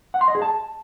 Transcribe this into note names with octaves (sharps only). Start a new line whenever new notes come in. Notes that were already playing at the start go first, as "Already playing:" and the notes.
F#5
C6
D#5
G#4
A5